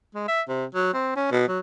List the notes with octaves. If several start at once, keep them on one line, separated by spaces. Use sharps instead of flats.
G#3
E5
C3
F#3
C4
C#4
B2
F#3